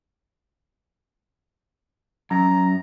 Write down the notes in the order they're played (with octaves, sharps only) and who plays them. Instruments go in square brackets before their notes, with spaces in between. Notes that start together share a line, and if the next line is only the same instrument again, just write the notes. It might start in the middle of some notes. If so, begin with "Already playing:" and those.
[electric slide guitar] F#2 [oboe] A#5